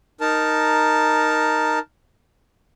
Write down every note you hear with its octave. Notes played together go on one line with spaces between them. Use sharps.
D#4 A#4 A5